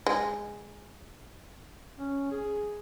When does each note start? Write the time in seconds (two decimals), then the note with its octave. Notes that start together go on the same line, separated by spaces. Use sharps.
0.06 G#3
1.98 C#4
2.32 G#4